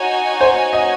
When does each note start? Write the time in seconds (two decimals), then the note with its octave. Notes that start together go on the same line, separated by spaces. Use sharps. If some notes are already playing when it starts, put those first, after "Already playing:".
Already playing: D#4 F#4 C#5 G#5
0.41 C5
0.73 D#5